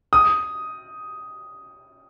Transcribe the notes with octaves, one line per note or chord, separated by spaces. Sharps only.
D#6